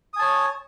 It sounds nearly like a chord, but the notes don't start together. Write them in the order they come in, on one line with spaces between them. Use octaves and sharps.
D#6 G#5 A5 C#5